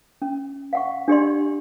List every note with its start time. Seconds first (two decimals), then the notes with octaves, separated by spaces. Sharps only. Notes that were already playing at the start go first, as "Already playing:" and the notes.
0.22 C#4
0.73 F5 F#5 C#6
1.08 D4 G4 D5 C6